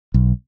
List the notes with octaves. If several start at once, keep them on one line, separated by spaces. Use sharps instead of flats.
B1